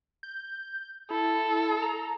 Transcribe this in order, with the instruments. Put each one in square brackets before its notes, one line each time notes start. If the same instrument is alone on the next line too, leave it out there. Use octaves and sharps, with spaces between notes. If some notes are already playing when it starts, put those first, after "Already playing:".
[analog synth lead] G6
[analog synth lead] E4 [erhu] A4
[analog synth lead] A#5